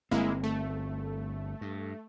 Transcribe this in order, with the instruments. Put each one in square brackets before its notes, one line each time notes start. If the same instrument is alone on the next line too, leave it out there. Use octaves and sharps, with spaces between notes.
[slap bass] G1 C4 [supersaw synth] G#3 A#3 E4
[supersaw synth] A3
[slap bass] G2